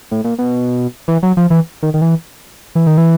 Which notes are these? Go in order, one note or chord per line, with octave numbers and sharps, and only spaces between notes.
A2
A#2
B2
E3
F#3
F3
E3
D#3
D#3
E3
E3
D#3
E3